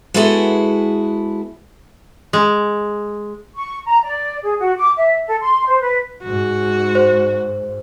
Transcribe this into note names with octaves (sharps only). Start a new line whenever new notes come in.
G#3 B3 E4 F#4 G#4 A4
G#3
C#6
A#5
D5
G#4
F#4
D6
E5
A4
C6
C5
B4
G#2 F#4
C5